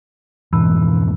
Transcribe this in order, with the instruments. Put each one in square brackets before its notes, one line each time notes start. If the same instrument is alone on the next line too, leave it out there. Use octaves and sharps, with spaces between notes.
[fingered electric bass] F2 G#2 B2 [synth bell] E3